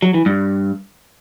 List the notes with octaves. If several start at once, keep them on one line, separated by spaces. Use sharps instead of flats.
F#3
E3
G2